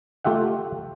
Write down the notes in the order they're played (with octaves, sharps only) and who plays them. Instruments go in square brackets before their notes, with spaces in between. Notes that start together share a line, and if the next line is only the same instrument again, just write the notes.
[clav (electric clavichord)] A3 F4 G4 E5 F#5